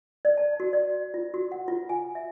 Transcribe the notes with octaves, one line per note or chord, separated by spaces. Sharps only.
D5
A5
F#4
D5
F4
F#4
F#5
F4
G#5
E5